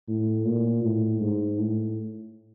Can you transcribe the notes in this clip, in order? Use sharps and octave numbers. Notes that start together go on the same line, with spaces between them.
A2
A#2
A2
G#2
A2